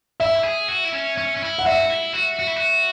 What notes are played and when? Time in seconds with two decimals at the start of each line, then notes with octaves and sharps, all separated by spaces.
0.20 E4 E5
0.44 G#4
0.68 F#4
0.85 E4
0.93 C#4
1.18 C#4
1.37 C#4
1.42 E4
1.58 F#5
1.66 F#4 E5
1.90 E4
2.14 F#4
2.39 F#4
2.47 E4
2.56 F#4